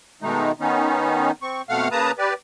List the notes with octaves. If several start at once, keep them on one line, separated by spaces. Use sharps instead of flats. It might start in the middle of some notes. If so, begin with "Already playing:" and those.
B2 D#3 G#3 A3 D#4
D#3 B3 C#4 D#4
C4 C#6
F2 B2 A3 F5 F#5 F6
C#3 A#3 B4 A5 A#5 D#6
G4 B4 D5